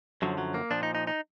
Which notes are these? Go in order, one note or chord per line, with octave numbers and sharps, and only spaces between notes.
F#2 D3 F3 F#3
F#3
A#3
A#2 F3 D4
D#4
D#4
D#4